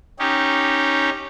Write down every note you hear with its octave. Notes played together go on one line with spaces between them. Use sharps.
C#4 D#4 G4